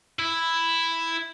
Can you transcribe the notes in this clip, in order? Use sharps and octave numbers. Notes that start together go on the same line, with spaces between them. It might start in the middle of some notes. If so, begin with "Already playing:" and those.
E4